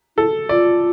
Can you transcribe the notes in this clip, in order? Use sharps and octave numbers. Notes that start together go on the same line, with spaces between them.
E4 A4
F4 D5